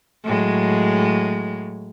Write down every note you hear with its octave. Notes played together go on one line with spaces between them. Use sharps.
A2 F#3 G#3